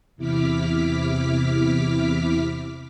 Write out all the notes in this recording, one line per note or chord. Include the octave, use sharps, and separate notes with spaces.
E2 C3 E4 D6 F6 B6